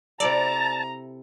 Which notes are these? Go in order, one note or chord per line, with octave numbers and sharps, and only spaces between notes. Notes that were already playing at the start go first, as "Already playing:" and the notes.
C3 E4 A4 D5 A5 A#5